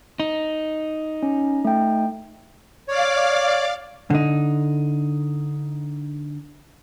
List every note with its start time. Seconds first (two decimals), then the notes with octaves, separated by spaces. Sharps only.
0.20 D#4
1.23 C#4
1.65 A3 G5
2.88 C#5 D5 F5 D6
4.10 D3 D#4